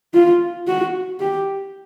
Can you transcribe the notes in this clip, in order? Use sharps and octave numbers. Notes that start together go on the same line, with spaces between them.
F4
F#4
G4